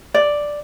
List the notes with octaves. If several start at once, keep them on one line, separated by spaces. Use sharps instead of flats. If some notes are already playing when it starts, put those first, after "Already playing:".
D5